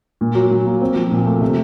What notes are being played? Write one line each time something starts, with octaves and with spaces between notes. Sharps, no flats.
A#2
F#3
A#2
A#3
C4
F3
A#2
A3
C3